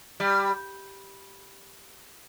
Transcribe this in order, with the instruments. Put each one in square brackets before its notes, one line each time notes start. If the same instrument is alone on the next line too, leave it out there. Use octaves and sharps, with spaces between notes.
[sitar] G3